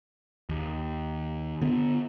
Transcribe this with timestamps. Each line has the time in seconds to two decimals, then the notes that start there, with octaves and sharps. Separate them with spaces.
0.49 D#2
1.62 D3 B3